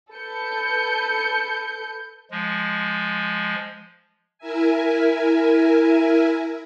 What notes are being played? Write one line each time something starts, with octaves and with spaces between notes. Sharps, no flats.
A4 B4 G6 C#7
F3 G#3
E4 A#4 E5 G#5